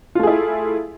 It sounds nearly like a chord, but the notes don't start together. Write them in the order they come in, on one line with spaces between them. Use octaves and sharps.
F4 A3 G#4 E4